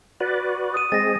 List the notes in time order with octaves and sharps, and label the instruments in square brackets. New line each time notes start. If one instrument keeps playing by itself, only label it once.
[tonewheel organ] F#4 B4 D5
[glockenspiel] D#6 D#7
[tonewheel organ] G#3 C4 G#4 [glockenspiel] A6 A#6